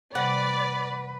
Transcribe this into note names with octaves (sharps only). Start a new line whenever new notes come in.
C3 G3 B4 D5 F#5